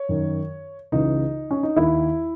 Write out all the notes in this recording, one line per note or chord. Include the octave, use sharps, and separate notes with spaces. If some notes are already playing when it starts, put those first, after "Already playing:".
Already playing: C#5
F#2 D#3
C#2 C#3 E3 D#4
C#4
D#4
D#2 D#3 E4